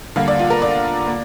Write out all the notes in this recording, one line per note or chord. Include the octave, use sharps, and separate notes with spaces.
D3 G3 A#3 F5
D5
F4
A#4
D5
A#3